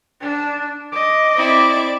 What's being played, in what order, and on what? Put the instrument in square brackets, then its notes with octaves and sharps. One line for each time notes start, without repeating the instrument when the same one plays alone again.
[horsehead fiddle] D4
[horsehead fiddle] D#5 [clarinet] D6
[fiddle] C4 E4 [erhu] D5